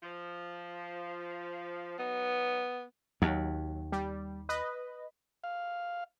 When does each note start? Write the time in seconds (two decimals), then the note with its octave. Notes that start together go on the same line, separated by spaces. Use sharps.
0.03 F3
1.99 F#3 B3 D#4
3.22 D#2 F#3
3.92 G3
4.49 B4 D#5
5.44 F5